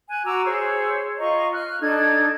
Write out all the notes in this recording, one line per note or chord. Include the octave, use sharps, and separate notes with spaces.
G#5 F#6
F#4 A#5 D6 E6
G#4 C5 C#5 E6
F4 D#5 A#5 C#6
F6 F#6
D4 D#4 A4 G#6